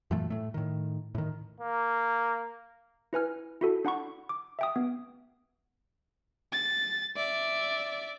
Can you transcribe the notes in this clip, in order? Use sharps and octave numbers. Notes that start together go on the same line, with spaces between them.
F#2 A#2 E3 A3
A2 A3
A2 D#3
A2 D#3
A#3
E4 B4 G#5 F6
E4 F#4 A4
D4 F#5 B5 C#6
D6
E5 G5 D#6
B3
A6
D5 E5